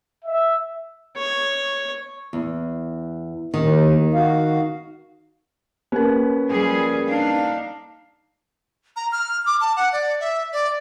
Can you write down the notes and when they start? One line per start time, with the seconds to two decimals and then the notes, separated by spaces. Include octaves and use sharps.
0.24 E5
1.17 C#5
2.33 E2
3.54 D#2 D#3
4.14 F#4 F5
5.92 A#3 C#4 A#4 B4
6.51 F3 G3 G#4
7.08 D4 D#4 F5
8.96 A#5
9.12 F6
9.46 D6
9.61 A5
9.77 F#5
9.93 D5
10.20 E5
10.53 D5